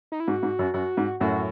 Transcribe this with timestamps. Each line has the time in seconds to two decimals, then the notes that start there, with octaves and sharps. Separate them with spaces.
0.12 D#4
0.20 E4
0.28 G#2 F#4
0.43 G#2
0.59 F#2
0.74 F#2 F#4
0.97 G#2
1.20 F#2 A2 F#4